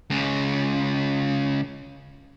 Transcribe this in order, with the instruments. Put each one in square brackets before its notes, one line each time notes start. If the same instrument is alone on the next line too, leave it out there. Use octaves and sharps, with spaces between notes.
[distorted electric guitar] C#2 C#3